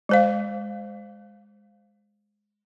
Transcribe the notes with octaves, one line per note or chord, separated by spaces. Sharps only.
G#3 C5 F5